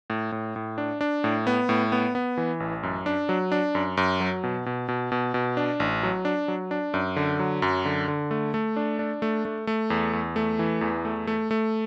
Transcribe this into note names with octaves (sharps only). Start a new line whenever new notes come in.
A2
A2
A2
D4
D4
A2
B3
A2
B3
B3
E3
A1
F#2
D4
F#3
D4
F#2
F#2
F#3
B2
B2
B2
B2
B2
D4
A1
F#3
D4
F#3
D4
F#2
D3
F#3
F#2
D3
D3
A3
A3
D4
D4
A3
A3
A3
E2
E2
A3
E3
E2
A3
A3
A3